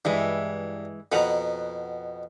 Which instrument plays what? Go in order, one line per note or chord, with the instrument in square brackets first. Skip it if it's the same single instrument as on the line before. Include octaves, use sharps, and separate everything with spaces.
[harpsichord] G2 [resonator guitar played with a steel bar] E3 G#3
[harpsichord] F2 B2 [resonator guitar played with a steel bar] B4 F#5 A#5